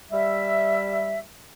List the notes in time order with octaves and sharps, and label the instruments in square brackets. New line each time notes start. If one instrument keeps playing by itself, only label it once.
[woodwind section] G3 E5